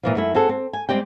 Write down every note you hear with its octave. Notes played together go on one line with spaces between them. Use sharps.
A#2 E3 F3
F#2 A3 E4
C4 F#4 G#4 A4
C4
G#5
G3 G#3 C4 G4 G5